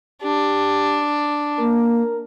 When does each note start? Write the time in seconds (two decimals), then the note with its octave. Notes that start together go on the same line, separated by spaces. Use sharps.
0.23 D4 G4
1.59 A#3 A#4